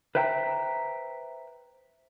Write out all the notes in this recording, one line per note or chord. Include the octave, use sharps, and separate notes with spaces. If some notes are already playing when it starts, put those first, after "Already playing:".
B4 C5 E5 G5 G#5 A#5